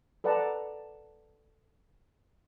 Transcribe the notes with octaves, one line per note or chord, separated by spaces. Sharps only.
A4 B4 D5 F#5 A5 A#5